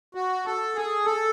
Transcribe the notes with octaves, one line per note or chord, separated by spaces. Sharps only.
F#4
A4
G#4
A4